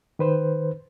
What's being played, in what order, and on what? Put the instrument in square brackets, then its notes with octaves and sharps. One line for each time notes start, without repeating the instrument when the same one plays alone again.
[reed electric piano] D#3 B4 C5